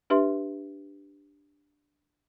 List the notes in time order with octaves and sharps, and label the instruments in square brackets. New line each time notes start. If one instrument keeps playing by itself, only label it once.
[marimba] D4 G4 B4 E5 C6